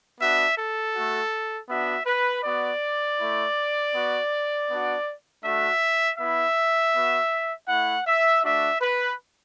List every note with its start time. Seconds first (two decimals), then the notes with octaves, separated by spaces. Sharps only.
0.18 B3 D4 F#4 E5
0.57 A4
0.94 A3 F#4
1.69 B3 D4 F#4 E5
2.06 B4
2.43 B3 F#4 D5
3.18 A3 E4
3.93 B3 F#4
4.69 B3 D4 F#4
5.43 A3 D4 F#4 E5
6.18 B3 E4 E5
6.93 B3 F#4
7.68 A3 E4 F#5
8.06 E5
8.43 A3 D4 F#4 E5
8.80 B4